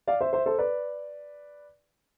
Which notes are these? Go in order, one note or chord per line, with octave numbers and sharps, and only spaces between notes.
D5 F5
C5 E5
C5 E5
A4 C5
B4 D5